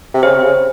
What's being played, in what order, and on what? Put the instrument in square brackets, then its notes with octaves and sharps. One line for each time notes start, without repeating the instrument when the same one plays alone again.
[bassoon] C3
[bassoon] C#3 [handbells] C5
[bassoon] C3
C#3